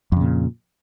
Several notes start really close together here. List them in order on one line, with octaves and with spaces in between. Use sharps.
F2 C#3 A#2